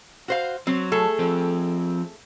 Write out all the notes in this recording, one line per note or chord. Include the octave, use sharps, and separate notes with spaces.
F#4 C5 F5
F#3 C4
A3 G#4 A4
F3 C4